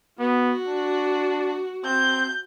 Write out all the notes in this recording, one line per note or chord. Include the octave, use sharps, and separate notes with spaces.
B3 F#4
D4
C4 G6